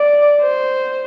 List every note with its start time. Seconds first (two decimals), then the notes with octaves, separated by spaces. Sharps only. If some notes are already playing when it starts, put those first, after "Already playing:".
Already playing: D5
0.42 C5